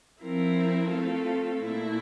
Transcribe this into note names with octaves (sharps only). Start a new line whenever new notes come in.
F3 C4 E4 A#4
A3 C4 F4 A4
A#2 A3 E4